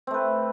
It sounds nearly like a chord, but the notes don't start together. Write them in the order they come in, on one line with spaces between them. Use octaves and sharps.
C4 A3 B4